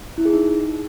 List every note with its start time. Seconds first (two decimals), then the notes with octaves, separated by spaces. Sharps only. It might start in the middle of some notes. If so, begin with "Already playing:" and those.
0.18 E4
0.25 G#4
0.33 D#4